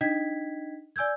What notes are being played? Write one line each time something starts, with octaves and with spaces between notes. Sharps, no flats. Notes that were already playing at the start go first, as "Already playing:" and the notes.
D4 D#4 D#5 G5 G#6 B6
D5 G#5 E6 G6 G#6